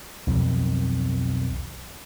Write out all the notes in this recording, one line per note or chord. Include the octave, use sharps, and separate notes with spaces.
B1 F2 D#3 C4